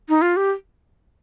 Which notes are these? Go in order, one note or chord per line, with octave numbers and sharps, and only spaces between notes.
D#4
F4
G4